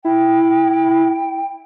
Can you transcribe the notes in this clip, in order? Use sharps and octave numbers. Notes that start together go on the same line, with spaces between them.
E4 G5